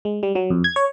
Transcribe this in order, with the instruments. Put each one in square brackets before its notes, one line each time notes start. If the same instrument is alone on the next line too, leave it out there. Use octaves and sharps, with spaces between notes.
[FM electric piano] G#3
G3
F#3
F2
G#6
C#5